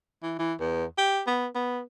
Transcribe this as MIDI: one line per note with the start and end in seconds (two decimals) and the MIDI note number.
0.23 0.37 52
0.39 0.54 52
0.60 0.85 40
0.98 1.21 67
1.27 1.47 59
1.55 1.80 59